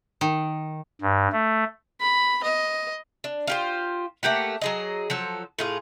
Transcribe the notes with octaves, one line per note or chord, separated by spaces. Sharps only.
D#3
G2
A3
B5
D#5
D4
F4 G4 C5
A3 A#3 G4 F#5
F#3 G#4 D#5
F3 F#3 A4
A2 F4 G#4